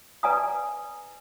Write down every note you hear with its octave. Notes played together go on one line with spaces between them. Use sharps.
B4 D5 G#5 A#5 D#6